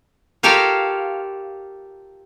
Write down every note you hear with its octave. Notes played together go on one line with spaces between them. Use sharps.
F4 G4 A4 A#4 C#5 F5